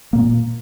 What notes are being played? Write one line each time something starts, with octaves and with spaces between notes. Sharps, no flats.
A#2 A#3